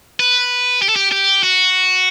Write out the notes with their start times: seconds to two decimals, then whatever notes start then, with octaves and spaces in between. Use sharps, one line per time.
0.20 B4
0.82 G4
0.89 A4
0.96 G4
1.12 G4
1.43 F#4